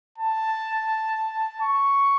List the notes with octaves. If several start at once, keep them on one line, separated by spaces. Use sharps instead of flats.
A5
C#6